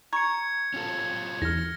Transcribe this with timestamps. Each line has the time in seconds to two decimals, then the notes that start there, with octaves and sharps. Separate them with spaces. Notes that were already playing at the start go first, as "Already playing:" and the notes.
0.13 A#5 C#6 G#6 C#7
0.74 C#4 F4 A4
1.42 E2 F6 A#6